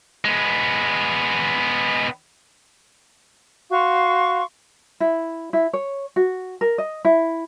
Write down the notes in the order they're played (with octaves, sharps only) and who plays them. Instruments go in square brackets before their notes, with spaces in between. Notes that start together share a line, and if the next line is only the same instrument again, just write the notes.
[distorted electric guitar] G#3 B3
[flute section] F#4 F5 C6 C#6
[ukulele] E4
E4
C#5
F#4
A#4
D#5
E4